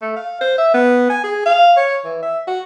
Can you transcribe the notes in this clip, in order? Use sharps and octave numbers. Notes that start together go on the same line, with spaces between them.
A3
F5
C5
E5
B3
G#5
G#4
F5
C#5
E3
E5
F#4